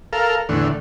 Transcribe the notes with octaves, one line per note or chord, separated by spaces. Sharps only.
A4 A#4 F5
E2 A2 D3